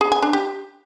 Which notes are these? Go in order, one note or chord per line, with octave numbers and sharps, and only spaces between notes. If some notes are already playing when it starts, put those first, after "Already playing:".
G#4
G#5
D4
G4